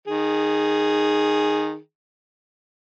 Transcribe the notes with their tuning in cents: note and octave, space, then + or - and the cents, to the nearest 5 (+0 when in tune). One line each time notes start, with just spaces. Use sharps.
D#3 -10 G#4 +0